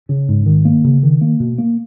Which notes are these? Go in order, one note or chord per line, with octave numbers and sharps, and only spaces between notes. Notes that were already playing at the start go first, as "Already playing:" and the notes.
C#3
G#2
D#3
A#3
C#3
D#3
A#3
B2
A#3